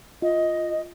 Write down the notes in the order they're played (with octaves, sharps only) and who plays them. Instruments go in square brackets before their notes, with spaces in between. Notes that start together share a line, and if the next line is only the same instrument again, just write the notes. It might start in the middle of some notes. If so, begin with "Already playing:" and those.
[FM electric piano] F4 [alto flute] D#5